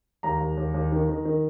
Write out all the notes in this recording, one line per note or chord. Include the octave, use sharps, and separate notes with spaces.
D#2 A#5
D#2
D#2
D#2
D#3
D#3
D#3